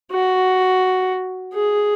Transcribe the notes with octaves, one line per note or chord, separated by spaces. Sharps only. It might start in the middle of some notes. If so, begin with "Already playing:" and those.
F#4
G#4